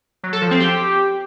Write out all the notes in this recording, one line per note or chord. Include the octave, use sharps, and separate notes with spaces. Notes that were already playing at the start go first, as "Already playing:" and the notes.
F#3
A4
F3
C4
G4